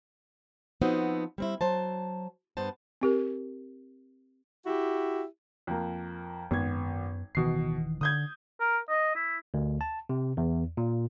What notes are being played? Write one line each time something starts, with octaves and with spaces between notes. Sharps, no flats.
F3 B3 C4 D#4 F#4
G3 C4 E4
F#3 C5 A5
G2 B3 C5 A5
C4 G4 A#4
E4 F#4 G4
F2 A#3
G#1 F#2 B3 G#6
D1 B2 D#3 E3 C7
D3 D#6 G6 G#6
A#4
D#5
E4
D2
A5
C3
E2
A#2